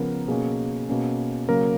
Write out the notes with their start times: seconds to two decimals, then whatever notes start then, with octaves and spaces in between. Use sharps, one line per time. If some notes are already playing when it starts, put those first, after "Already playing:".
Already playing: C#3 F3 B3 A#4
0.28 B2 A#3 C#4 G#4
0.89 B2 A#3 C#4
1.49 C#3 F#3 A#3 A#4